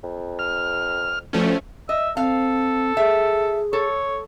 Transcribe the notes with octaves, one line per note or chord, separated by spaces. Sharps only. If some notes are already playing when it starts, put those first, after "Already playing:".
F2
F6
D2 F3 A3 C#4
D#5 E5
C4 A4 F5
G#4 E5
A4 C#5